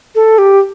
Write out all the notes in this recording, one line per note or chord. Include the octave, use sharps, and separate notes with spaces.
A4
G4